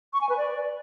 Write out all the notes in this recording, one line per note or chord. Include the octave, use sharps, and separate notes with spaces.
C#6
G#5
B4
D5